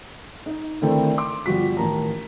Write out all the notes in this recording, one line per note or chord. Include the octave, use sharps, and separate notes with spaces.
D#4
D3 D#3 A3 C4 E4 A4
C6 D6
G1 F3 G3 F#4 B6
A1 D#3 A#4 A5 A#5